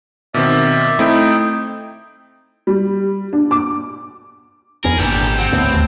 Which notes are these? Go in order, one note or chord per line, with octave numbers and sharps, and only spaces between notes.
B2 D#3 C4 D5 E5
A3 C4 D#4 E4 G5
G3
D4
D6
F2 B3 G#4 A#4
G#1 A#2 D3 G4 A4
G#2 C4 F#5
D2 A2 B3 C#4
D#2